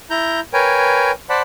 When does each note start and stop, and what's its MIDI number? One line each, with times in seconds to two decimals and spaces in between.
0.10 0.40 64
0.10 0.40 82
0.10 0.40 91
0.53 1.11 70
0.53 1.11 71
0.53 1.11 73
0.53 1.11 79
0.53 1.11 80
1.29 1.42 72
1.29 1.42 74
1.29 1.42 78
1.29 1.42 81
1.29 1.42 83